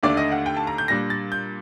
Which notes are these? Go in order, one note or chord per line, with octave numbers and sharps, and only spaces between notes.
D#2 D3 A3 D4 D5
D#5
F#5
G5
A5
A#5
G6
A#2 G3 D4 A#6
A6
G6